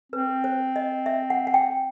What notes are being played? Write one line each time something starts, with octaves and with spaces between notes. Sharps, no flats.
C4 B4
C5
D#5
E5
F#5
F#5
G5